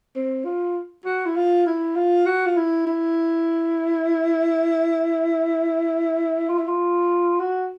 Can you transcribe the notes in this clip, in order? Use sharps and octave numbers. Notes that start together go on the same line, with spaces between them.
C4
F4
F#4
E4
F4
E4
F4
F#4
F4
E4
E4
F4
E4
F4
F#4